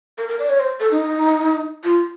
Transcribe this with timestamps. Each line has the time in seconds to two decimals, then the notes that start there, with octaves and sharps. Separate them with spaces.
0.18 A#4
0.29 A#4
0.39 D5
0.49 C#5
0.60 C5
0.80 A4
0.91 D#4
1.84 F4